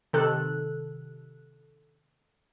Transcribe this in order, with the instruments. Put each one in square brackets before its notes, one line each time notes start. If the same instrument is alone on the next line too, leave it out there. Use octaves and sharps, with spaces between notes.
[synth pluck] C3 D#3 A4 F#6